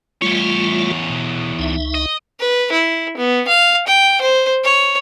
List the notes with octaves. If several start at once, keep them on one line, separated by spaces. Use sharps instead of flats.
E2 G3 A3 F4 C#5
B2
C#2 D#4 E5
D#5
B4
E4
B3
F5
G5
C5
C#5